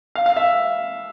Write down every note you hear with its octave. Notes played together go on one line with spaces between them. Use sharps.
F5
F5
E5